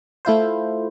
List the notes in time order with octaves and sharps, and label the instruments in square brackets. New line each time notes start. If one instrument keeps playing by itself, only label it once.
[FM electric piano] A3 E4 F4 C5